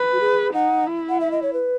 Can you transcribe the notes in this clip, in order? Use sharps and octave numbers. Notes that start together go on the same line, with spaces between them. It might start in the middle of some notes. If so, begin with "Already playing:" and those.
Already playing: B4
F#4
G#4
D#4 F#5
E4
F#5
E5
D#5
C#5
B4